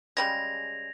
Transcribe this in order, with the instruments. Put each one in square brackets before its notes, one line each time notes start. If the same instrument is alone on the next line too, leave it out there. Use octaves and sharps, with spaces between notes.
[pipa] C#3 G3 G#3 [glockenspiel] G#6 A#6 F7